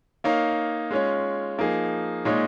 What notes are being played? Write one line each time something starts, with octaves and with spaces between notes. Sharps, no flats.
A#3 D#4 C#5 F5
G#3 C#4 F4 C#5
F3 A#3 D#4 G#4
A#2 G#3 D#4 C#5